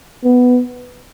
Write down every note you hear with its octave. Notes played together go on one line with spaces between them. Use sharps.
B3